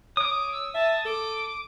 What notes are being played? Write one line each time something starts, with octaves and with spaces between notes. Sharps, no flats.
C#5 D6 D#6
E6
E5 A5
A4 D6